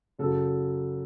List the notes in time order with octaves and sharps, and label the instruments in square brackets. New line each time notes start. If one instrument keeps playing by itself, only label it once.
[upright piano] F#2 C#3 F#3 A4